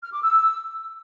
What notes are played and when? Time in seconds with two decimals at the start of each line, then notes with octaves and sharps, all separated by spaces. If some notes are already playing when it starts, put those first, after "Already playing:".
0.04 F6
0.13 D6
0.22 E6